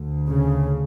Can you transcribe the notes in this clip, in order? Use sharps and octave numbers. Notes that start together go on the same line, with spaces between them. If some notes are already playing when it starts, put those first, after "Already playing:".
Already playing: D2
C#3